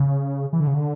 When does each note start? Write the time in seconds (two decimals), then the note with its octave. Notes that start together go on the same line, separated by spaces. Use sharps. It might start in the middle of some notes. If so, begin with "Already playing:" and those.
Already playing: C#3
0.53 E3
0.60 D3
0.67 C#3
0.75 D3